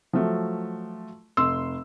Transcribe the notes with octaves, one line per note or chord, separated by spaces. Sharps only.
F3 F#3 A3
F1 C6 E6